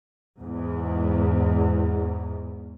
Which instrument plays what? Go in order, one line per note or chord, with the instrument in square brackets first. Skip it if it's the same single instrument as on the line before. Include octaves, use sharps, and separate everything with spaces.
[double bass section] E2 G#2